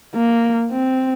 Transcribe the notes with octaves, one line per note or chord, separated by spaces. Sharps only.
A#3
C4